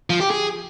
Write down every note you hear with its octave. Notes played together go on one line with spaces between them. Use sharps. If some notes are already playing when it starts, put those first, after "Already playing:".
F3
G4
G#4